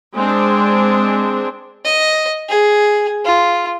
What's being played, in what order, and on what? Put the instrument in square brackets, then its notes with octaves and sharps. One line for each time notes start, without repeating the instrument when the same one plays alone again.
[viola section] G#3 C4 D4
[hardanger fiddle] D#5
G#4
F4